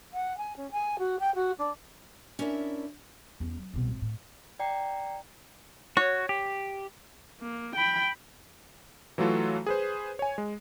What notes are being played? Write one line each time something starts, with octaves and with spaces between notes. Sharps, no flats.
F#5
G#5
C#4
G#5
F#4
G5
F#4
D4
C#4 D4 E4 A#4 E5
E2 C#4
F#3
C2 B2
G#1
A2
D5 G5 A#5 C7
F#4 C#5
G4
A#3
G5 B5
E3 F#3 A3 F4 F#4 A4
G#4 B4 C5
C#5 G#5
G#3